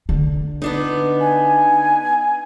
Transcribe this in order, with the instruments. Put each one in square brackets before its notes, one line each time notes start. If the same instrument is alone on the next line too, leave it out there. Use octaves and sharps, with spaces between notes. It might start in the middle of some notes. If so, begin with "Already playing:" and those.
[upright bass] D3
[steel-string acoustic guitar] B3 D4 D#4
[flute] G#5